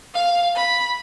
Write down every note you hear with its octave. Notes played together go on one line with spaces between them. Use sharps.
F5
B5